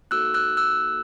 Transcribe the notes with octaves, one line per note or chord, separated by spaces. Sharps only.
A#3 D#4 F#4 A4 E6 F#6
E6 F#6
E6 F#6